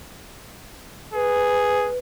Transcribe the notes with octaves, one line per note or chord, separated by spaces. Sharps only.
G#4 B4